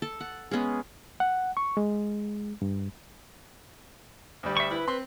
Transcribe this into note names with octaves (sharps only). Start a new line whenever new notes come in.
A4 A5
F#5
G#3 B3 C#4 G#4
F#5
C#6
G#3
G2
D2 G3
E5 C#6
E4 B4
C4 C6